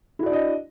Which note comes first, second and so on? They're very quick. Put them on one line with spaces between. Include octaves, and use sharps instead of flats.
E4 F#4 D5 D4 D#5